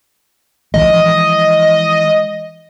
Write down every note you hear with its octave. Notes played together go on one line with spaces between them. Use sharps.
E3 F3 G#3 D#5